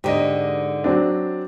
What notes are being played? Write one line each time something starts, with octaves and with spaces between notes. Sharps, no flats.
G#2 D3 G4 D#5
F#3 C4 D4